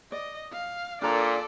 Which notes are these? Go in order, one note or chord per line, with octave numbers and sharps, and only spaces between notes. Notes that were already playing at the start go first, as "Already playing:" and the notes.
D5 D#5
F5
A#2 D4 A4 A#4 D5 A#5